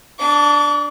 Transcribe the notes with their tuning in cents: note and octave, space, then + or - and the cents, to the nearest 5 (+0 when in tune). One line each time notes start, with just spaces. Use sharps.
D4 +0 D6 -40